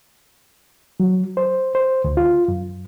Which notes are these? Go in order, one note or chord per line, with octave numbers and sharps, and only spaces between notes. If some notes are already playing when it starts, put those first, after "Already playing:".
F#3
C5
C5
D2
F4
F#2